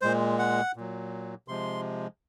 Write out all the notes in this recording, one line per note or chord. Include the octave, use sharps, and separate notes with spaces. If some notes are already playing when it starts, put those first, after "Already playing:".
A#2 G#3 C5
F#5
A#2 F#3
C3 F3 G#3 C6